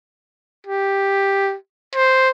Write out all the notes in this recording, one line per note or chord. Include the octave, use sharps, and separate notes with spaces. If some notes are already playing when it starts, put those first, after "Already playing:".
G4
C5